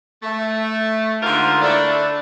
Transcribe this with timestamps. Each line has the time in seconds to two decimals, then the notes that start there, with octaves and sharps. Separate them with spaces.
0.23 A3
1.22 G#2 D3 F4 A#4 C5
1.62 D3 A3 D4 E4 A4 D5